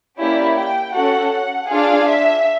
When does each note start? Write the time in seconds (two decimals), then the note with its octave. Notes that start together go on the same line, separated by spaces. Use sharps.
0.18 A#3 C#4 E4 G4 D5
0.56 G5
0.94 C#4 F#4 A4 F#5
1.32 F#5
1.69 D4 F4 G#4 F5
2.07 E5